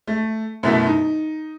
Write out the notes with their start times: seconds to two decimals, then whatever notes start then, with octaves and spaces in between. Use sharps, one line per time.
0.07 A3
0.63 F#2 B2 F#3 A3 E4
0.87 D#4